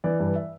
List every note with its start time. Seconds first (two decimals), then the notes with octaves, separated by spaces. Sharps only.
0.04 E3 D5
0.20 G2
0.35 E5